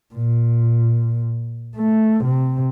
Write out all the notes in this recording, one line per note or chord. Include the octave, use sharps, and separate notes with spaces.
A#2
A3
C3